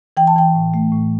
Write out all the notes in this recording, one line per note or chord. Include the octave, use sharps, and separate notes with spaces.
E3 G5
A5
E3 G5
A2
A3
A2